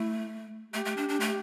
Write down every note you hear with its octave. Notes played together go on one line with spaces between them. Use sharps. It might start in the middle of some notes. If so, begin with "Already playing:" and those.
Already playing: A3 E4
A3 G4
A3
D4
D4
A3